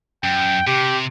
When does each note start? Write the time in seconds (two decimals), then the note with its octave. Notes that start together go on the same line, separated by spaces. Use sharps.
0.24 F#2 G5
0.67 C3 G4